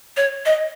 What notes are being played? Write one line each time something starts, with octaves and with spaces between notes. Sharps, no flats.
C#5
D#5